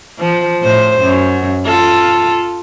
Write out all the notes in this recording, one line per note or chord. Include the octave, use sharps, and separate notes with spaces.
F3
A2 C5
F#2
F4 A4